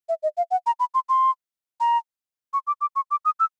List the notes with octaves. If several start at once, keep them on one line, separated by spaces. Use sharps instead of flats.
E5
D#5
F5
F#5
A#5
B5
C6
C6
A#5
C#6
D6
D6
C#6
D6
D#6
E6